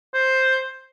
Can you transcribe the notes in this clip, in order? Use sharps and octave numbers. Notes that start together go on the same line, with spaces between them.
C5